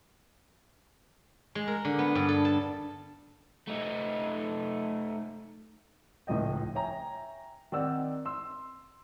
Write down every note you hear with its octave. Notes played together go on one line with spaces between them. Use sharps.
G#3
A#4
D3
B3
G2
A4
A5
A3 D#4
D#1 C#2 A2 F3 D#5 G5
C#5 E5 G5 G#5 A#5
D#3 C4 D#4 D5 F#5 E6
C6 E6